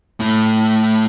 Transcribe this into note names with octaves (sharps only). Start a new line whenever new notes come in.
A2 A3